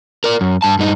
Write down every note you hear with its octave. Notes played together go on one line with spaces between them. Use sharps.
A#4 D5
F#2
G2 A5
G2 D#4